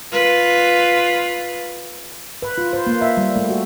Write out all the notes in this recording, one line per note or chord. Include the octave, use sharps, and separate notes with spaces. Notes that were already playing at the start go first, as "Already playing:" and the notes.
F4 B4
B4
F4
C5
A#3
E5
G3
A3
F#4